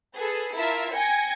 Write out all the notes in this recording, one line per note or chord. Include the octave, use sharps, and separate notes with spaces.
G#4 A4 B4
E4 F4 A#4 E5 A5
G5 G#5 G#6 A#6 C#7